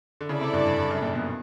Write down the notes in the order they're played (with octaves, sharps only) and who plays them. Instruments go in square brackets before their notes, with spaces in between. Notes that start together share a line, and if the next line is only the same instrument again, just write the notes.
[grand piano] D3
[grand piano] C#3 [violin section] E4 A4 D5
[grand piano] C3
G2
G2
G2
F#2
A#2
B2